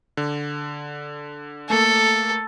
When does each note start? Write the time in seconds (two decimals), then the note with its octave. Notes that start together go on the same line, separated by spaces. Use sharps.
0.17 D3
1.70 A3 A#3 A4